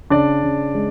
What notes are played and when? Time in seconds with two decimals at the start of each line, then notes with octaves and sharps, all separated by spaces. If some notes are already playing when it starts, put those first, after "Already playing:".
0.10 C#3 D4 D5
0.44 C#3
0.75 G#3